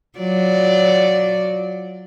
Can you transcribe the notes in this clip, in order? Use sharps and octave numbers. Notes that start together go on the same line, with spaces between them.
F#3 F4 D5